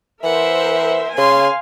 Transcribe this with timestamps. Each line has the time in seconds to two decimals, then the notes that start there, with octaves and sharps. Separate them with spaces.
0.24 E3 A#4 C5 E5 F#5
1.18 C#3 F5 G#5 C6